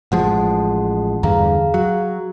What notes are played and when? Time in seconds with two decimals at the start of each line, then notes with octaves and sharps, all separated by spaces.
0.12 A1 F3 G#3 F#5 A5
1.23 E2 G2 D3 G#4 F5 A#5
1.74 F#3